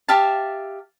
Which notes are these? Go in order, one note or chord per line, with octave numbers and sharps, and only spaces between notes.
G4 E5 F5 A5